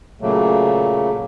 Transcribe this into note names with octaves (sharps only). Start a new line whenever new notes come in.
A#2 C#3 F#3 A3 A#3